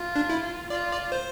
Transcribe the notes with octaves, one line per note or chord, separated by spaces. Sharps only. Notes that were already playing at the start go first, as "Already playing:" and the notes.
Already playing: F4
D4
E4
F4 D5
D5
C5